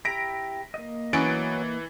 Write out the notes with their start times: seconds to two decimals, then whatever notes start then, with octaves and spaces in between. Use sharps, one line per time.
0.05 E4 G4 A#5 A#6 B6 D7
0.74 A#3 D#5
1.13 E3 F#3 B3 C#4 A6 D7